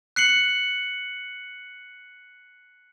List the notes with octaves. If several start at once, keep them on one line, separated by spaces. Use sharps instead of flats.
F#6 C7 C#7 F#7